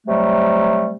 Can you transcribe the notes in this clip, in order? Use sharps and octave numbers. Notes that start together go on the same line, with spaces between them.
C3 F#3 G3 A3